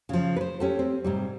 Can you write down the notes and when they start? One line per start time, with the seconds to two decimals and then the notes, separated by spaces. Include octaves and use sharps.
0.09 C#3 F3
0.36 B4 C5
0.60 C#4 G4 A4
0.79 C4
1.04 G#2 C3 G3